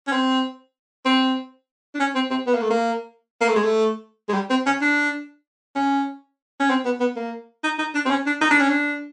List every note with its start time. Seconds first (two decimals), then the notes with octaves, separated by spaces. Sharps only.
0.07 C#4
0.12 C4
1.05 C4
1.95 D4
2.00 C#4
2.15 C4
2.31 C4
2.47 B3
2.54 A#3
2.62 A3
2.70 A#3
3.41 A#3
3.49 A3
3.56 G#3
3.64 A3
4.29 G#3
4.34 G3
4.50 C4
4.66 C#4
4.81 D4
5.76 C#4
6.60 C#4
6.70 C4
6.85 B3
7.00 B3
7.16 A#3
7.64 D#4
7.79 D#4
7.94 D4
8.06 C4
8.10 C#4
8.26 D4
8.41 D#4
8.51 D4
8.61 C#4
8.70 D4